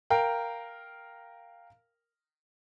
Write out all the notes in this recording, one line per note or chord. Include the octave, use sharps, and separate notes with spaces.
A#4 F5 G5